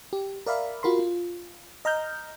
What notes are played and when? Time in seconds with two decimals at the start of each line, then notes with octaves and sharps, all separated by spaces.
0.13 G4
0.46 A#4 D5 E5 F5 B5
0.83 F4 F#4 A#4 B5 C6
0.99 F4
1.85 D#5 A#5 F6 G6